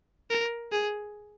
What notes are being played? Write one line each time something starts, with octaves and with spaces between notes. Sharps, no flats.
A#4
G#4